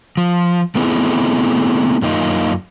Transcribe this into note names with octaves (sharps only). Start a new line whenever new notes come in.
F3
A3 B3 C4 D#4 E4 G#4
F#2 A#3 D#4 F4